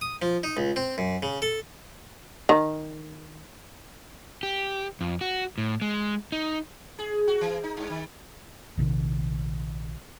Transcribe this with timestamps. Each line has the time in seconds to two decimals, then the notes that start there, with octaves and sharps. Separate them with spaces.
0.01 D#6
0.22 F3
0.43 D#4
0.57 C#2
0.76 C4
0.98 F#2
1.23 C#3
1.42 A4
2.49 D#3
4.43 G4
5.01 F2
5.21 F#4
5.58 A2
5.82 G#3
6.32 D#4
6.99 G#4
7.28 F#4
7.41 E3
7.63 D#4
7.77 G2
7.90 D#3
8.77 A#1 C3 D#3